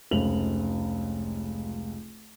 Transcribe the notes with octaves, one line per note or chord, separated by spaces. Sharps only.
F1 C#2 F7 F#7